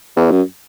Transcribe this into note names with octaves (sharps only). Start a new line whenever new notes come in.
E2
F#2